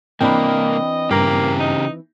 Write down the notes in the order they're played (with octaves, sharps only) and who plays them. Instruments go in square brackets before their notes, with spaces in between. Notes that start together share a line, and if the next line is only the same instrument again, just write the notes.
[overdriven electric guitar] C2 A#3 [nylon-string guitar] E3 C4 D4 [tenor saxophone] D#5 [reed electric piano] G5 B5
[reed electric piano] G2 A#5 [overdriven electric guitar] C#3 G4 [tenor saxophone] A#3
[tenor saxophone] D#4